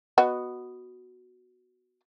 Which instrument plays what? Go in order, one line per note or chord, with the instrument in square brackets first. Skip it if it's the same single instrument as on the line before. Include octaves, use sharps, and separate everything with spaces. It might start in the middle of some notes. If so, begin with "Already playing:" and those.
[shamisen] B3 F#4 D#5